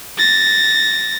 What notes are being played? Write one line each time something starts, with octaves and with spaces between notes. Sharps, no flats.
A6 A#6